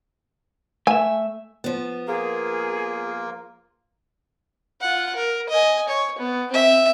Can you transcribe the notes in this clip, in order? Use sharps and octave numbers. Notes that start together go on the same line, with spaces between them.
A3 E5 G#5
F3 B3
A#3 F4 G#4 A#4
F4 F#5
A#4
D#5 G#5
C#5
B3
C4 E5